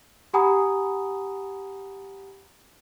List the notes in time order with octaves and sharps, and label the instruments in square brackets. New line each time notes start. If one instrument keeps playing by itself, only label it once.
[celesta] G4 F#5 G#5 A#5 B5 D#6